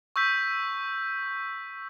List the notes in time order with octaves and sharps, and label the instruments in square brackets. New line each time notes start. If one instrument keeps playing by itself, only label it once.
[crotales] C#6 E6 G6 B6